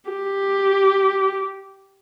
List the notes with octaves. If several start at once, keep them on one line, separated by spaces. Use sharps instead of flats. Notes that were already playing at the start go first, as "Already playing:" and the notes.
G4